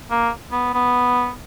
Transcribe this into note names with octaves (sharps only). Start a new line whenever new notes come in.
A#3
B3
B3